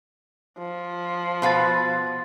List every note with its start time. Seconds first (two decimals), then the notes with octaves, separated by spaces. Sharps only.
0.58 F3
1.42 B2 B4 F5 C6 A6